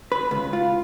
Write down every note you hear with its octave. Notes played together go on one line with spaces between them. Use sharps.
B4
C#2
F4